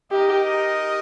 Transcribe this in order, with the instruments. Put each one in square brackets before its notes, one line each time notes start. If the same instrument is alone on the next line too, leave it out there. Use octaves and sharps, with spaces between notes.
[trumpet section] D#4 A#4 D#5 [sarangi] G4